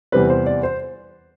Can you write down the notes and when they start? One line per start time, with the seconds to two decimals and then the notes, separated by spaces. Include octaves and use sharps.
0.12 E2 C3 G3 C4 B4
0.30 C5
0.46 D5
0.63 C5